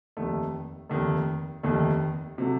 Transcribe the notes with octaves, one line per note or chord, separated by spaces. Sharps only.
F1 D#2 D#3 A3
F1 D#2 D#3 A3
F1 D#2 D#3 A3
C3 F#3 A3